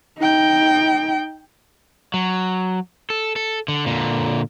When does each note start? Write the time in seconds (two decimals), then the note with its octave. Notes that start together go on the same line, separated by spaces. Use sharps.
0.18 D#4 G5
2.14 F#3
3.10 A4
3.36 A4
3.68 D3
3.86 A#2 D3